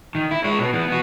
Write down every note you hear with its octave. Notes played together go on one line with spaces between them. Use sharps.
D#3
E4
G#3 C#5
B2 B3
E3 B3
B3 F#4